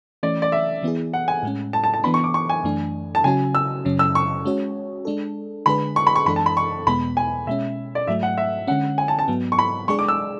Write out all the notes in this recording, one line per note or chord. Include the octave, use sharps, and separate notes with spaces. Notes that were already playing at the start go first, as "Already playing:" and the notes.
E3 A3 C#4 D5
D5
E5
E3 B3 E4 G#4
F#5
G#5
A2 G#3 C#4
A5
A5
A5
E3 B3 D4 B5
C#6
D6
C#6
G#5
F#2 E3 A3 D4
A5
C#3 F#3 C#4 F#4 G#5
E6
F#2 C#3 F#3 C#4
E6
C#6
G#3 C#4 F#4 C#5
G#3 D4 A4
D3 G#3 D4 G#4 B4 B5
C#6
B5
C#6
F#2 E3 G#3 D4 A4 B5
A5
B5
C#6
E2 B2 G#3 B3 B5
G#5
B2 G#3 C#4 E5
D5
G#2 F#3 A3 E5
F#5
E5
D3 G#3 C#4 F#5
G#5
A5
A5
G#2 F#3 B3
C#6
B5
G#3 D4 G#4 D5 C#6
D6
E6